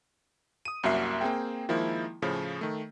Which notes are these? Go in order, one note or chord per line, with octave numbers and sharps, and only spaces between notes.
D#6 D#7
C2 F#2 A#3 F#4 E5 C7
A#3 C4 G#4 G5
D#3 F3 G#3 A#3 E4
A2 C#3 F3
D#3 A3